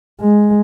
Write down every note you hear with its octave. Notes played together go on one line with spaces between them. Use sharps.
G#3